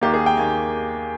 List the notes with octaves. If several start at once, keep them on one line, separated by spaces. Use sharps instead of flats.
D#2 D#3 A#3 G4
G#4
G5
D#2 D#3 A#3 G#5